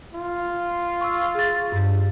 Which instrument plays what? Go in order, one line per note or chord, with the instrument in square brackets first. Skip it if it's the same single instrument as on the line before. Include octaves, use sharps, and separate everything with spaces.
[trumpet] F4
[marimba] C#6 E6
G#4 A6
G2